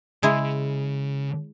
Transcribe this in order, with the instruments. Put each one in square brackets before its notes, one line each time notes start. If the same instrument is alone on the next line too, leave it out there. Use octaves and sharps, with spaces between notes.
[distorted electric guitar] C#3 [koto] G#3 E4